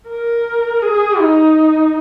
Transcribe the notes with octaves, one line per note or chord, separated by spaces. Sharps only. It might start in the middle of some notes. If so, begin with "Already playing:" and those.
A#4
G#4
D#4